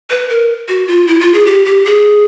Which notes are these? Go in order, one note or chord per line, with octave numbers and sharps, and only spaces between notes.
B4
A#4
F#4
F4
E4
F4
G#4
G4
G4
G#4